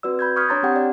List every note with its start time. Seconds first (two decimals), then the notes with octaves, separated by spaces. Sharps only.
0.03 C4 F#4 B4 D5 E6
0.19 B5 G6 G#6
0.36 C#6 D#6 F6 G6 G#6 B6
0.49 D4 C#5 A#5 C6 A6
0.63 C4 G4 F#5 G5
0.76 D5